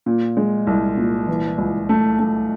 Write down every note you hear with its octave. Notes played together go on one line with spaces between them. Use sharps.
A#2
G#3
C2
A#2
E3
C#2
A3
A3